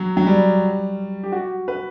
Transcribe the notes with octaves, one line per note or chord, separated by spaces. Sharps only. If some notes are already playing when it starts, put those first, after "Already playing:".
Already playing: F#3
F#3
G3
G4
F#4
B4